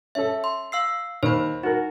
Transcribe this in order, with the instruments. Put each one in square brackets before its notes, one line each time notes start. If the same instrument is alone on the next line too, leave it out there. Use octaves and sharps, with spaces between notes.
[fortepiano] C#4 A4 [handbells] E5
[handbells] C6
F5 E6 C7
[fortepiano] D#2 [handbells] C5 B5
[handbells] D#4 [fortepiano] F#4 A#4